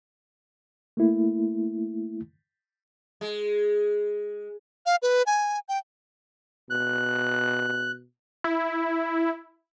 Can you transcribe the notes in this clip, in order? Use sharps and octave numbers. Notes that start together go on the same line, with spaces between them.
A3 A#3 E4
G#3
F5
B4
G#5
G5
B2 F#6
E4